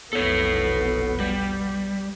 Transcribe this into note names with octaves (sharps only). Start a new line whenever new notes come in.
F1 B1 B3 A4 C#5
G3